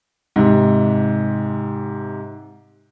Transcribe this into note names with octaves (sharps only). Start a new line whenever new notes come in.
G#2 C3